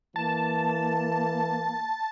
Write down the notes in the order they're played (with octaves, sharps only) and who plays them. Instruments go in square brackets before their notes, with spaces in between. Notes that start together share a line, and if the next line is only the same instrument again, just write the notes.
[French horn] E3 [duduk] A#3 [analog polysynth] A5